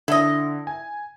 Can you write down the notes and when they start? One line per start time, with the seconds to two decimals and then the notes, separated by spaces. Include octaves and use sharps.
0.08 D3 E4 D#5
0.67 G#5